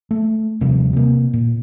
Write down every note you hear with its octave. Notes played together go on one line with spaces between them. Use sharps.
A3
D#1 C3 F3 G3
C3 A#3
A#2